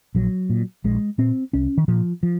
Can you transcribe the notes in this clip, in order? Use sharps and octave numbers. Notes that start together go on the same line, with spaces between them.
A#1 F#3
A#2
A#1 G#3
A#2 C4
C2 C#4
D#3
A#2 F3
F3